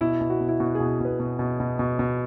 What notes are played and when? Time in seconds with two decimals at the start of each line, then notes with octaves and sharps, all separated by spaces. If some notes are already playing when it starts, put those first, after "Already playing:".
0.01 B2 E4
0.21 B2
0.30 F#4
0.40 B2
0.48 E4
0.60 B2 F#4
0.75 G#4
0.80 B2
1.00 B2 B4
1.20 B2
1.39 B2
1.60 B2
1.79 B2
1.99 B2